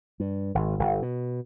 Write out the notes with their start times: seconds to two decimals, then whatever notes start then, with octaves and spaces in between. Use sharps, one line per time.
0.20 G2
0.55 G#1
0.79 G1
1.02 B2